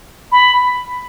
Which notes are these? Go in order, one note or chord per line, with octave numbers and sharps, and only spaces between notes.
B5